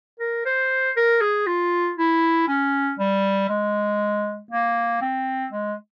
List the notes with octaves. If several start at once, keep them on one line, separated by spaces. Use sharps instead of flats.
A#4
C5
A#4
G#4
F4
E4
C#4
G3
G#3
A#3
C4
G#3